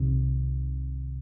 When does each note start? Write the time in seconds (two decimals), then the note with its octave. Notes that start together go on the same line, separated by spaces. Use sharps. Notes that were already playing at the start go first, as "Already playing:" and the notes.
Already playing: C2 C3 D#3